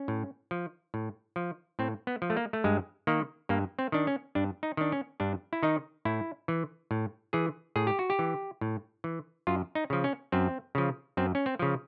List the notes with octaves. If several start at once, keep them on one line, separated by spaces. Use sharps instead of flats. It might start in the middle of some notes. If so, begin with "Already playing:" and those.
Already playing: C#4
A2
F3
A2
F3
A2 C4
B3
F3
A3
A#3
A3
G2 G#3
D#3 A#3
G2 A#3
C4
D#3 D4
C#4
G2 D4
D#4
D#3 D4
C#4
G2 D4
E4
D#3 D#4
A2 E4
E3
A2
E3 G#4
A2 G#4
G4
F#4
G4
E3
A2
E3
F#2 F4
D#4
C#3 F3
C#4
F#2 C4
C#3 F3
F#2 C4
C#4
C4
C#3 F3